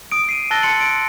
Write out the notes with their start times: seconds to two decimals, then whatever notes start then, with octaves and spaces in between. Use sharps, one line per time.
0.12 D#6 D7
0.29 C7 D#7
0.51 A5 E6 F#6 A6 A#6 G7
0.63 C6 C#7 F#7
0.80 D7